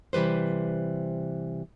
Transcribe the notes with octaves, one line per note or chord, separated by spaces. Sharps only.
C3 E3 G3 B4 C5